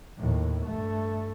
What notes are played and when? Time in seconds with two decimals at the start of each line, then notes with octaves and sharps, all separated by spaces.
0.18 D#2 A2
0.66 G2 A3